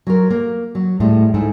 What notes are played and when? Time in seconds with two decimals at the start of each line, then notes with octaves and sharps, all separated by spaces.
0.07 F#3 F4 A#4
0.30 A#3
0.75 F#3
1.00 A2 G3 G#3
1.34 G#2 A3 E4